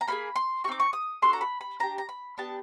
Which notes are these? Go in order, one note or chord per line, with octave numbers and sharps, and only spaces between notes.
A#5
A#3 D#4 G#4 B5
C6
F#4 C#6
C4 D#4 D6
C#6
D#6
D4 F#4 A4 C6
A#5
B5
B5
D4 G4 A#5
A#5
B5
B3 D4 G4 A5